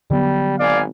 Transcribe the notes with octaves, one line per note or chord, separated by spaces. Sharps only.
D3 F#3 G3 B3
G#1 D5 F5 G#5